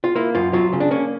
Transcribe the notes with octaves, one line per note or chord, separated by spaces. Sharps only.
F4
A#3 E4
F#2 F4
F#3 F4
C#3
D4
A#3 C#4